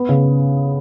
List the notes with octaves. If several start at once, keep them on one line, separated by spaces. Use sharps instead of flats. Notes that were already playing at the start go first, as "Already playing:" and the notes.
Already playing: B3
C#3